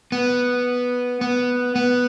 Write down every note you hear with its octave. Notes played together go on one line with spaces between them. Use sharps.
B3
B3
B3